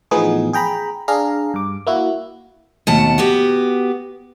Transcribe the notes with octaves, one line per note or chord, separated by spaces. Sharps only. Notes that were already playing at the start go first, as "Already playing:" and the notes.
A2 E3 F3 B3 D#4 G#4
G#4 G5 A#5 B5
D4 G#4 F5 A#5
G2 D6
A#3 E4 F#4
D#2 B2 A3 F#5 A5
B3 F#4 G4